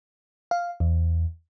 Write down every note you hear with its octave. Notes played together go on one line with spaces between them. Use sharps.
F5
E2